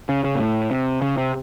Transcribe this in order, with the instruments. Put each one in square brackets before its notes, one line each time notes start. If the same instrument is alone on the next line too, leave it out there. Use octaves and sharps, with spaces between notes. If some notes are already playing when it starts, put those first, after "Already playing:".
[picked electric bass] C#3
C#3
A#2
A2
C3
C#3
C3